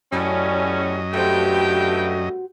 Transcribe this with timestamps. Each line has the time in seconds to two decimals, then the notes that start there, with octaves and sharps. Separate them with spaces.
0.12 F#2 A2 F#3 A3 C#4 G4 D5 D#5
1.13 G2 F#3 A3 F#4 G4 C5 G5